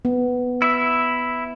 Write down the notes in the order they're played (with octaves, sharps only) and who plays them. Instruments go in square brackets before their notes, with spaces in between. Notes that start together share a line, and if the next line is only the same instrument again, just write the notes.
[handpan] B3
[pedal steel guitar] E4 E5